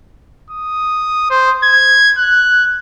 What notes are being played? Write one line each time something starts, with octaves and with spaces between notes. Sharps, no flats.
D#6
C5
G#6
F#6